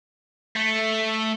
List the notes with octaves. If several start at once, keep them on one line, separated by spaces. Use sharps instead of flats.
A3